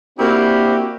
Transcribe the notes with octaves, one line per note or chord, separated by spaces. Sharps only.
A#3 C4 D4 E4 F#4 G4